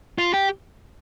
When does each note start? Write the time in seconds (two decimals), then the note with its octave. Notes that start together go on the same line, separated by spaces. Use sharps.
0.18 F4
0.34 G4